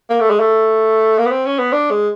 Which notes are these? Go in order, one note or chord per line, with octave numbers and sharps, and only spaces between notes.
A#3
A3
G#3
A3
A#3
B3
C4
C#4
B3
D4
G#3